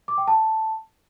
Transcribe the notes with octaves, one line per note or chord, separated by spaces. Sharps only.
D6
G5
A5